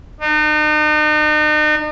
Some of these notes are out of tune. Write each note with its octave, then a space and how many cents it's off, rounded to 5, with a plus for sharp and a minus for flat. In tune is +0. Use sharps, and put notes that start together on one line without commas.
D#4 -40